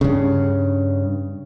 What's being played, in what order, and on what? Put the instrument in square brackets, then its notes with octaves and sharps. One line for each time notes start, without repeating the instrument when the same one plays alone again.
[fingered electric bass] G2 C#3